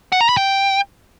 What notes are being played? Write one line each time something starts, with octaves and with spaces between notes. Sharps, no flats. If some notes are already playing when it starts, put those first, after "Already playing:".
F#5
A#5
B5
G5